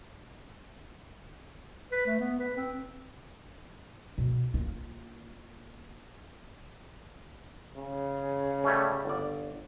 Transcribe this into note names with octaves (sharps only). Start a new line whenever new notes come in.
B4
A3
B3
B4
C4
B2
A#3 F4
C#3
G3 A3 C#4
G1 D5